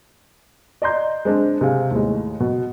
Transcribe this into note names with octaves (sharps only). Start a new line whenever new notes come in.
D5 D#5 A#5 C6 G6
G#3 C4 D4
C3 G#4 F5
D#2 A2 G#3
B2